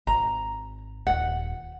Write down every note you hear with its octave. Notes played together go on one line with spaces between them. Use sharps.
G#1 A#5
D#1 F#5